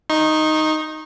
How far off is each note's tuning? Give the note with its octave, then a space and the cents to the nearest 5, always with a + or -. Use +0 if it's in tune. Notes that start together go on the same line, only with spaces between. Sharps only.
D#4 +0 C#6 -35